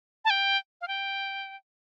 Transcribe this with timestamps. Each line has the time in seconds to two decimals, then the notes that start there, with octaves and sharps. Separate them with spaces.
0.25 A5
0.30 G5
0.81 F5
0.88 G5